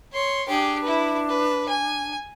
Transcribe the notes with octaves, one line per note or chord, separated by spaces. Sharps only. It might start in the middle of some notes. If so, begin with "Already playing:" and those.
C#5 C6
D4 G4 G#4
E4 B4
B4
G#5